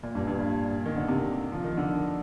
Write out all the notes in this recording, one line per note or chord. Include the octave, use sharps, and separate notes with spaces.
A#2
G2
G2
A#2
D#3
D3
C3
F3
D#3
D3